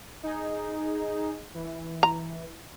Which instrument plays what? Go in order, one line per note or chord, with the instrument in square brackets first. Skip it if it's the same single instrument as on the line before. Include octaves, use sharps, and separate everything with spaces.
[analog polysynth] D#4 G#4
E3
[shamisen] A#5